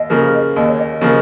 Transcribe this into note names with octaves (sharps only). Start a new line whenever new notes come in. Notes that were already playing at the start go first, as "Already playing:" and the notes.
Already playing: D#2 D#5
C#3 F3 A#3
D#2 D#5
C#5
D#5
C#3 F3 A#3